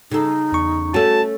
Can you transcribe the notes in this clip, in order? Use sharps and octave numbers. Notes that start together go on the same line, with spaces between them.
C#3 D#4 A4
E2 C#6
A3 C#4 F#4 A4 A5